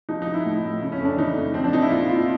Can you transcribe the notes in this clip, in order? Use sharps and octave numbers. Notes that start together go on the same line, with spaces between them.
F3 D#4
D#4
F3
E4
A2
A2
C#3
C#4
F2 D4
E3 D#4
F2
F3 C4
D4
F3 D#4
E4
A#2 F4
A#2 F4